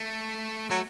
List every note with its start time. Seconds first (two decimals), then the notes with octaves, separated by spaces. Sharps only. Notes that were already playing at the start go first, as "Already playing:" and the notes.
Already playing: A3
0.70 F#3 A3